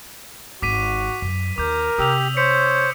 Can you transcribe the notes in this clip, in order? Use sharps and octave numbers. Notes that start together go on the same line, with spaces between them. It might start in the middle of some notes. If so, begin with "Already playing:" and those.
G#1 F#4 D6 B6 D#7
F#2
D#2 A#4 D6 G6
C3 G4 D#6 E6 F7
C5 C#5 B6 C#7